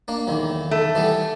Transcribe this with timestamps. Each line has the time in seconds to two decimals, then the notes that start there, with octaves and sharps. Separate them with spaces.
0.08 A#3 D4
0.27 B1 E2 D#3
0.71 A3
0.95 E3 G3 B3